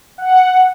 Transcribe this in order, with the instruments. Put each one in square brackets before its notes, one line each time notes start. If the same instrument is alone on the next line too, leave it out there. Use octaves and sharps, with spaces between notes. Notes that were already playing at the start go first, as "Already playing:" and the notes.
[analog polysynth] F#5